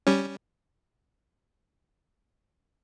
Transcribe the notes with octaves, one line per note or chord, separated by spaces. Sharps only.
G3 C#4